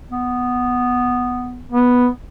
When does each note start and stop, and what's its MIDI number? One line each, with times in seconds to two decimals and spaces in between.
0.11 1.64 59
1.72 2.07 59